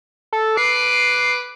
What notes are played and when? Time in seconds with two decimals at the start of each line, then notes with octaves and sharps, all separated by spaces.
0.33 A4
0.57 B4 D6 C7